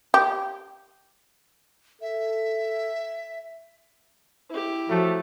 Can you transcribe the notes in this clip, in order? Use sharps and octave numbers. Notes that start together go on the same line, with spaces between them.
G4
A4 E5
E4 G4
F3 F#3 A3